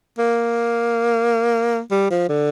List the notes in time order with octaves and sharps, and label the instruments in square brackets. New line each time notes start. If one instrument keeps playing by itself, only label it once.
[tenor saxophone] A#3
G3
F3
D3